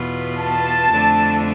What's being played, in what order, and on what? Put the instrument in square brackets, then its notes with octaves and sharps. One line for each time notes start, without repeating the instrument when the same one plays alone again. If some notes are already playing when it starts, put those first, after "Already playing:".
Already playing: [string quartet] E2 B2 B3 F4
[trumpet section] A5
[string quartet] F2 D3 A3 D4 A4